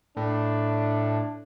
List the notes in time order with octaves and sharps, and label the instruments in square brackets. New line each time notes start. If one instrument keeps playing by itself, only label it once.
[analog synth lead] A2 [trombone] D4